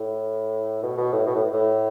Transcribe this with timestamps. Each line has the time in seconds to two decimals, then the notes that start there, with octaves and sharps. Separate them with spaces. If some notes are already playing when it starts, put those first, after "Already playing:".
Already playing: A2
0.83 B2
0.98 B2
1.13 A2
1.27 B2
1.35 A2
1.53 A2